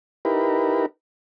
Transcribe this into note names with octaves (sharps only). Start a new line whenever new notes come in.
D#4 E4 G4 A#4 B4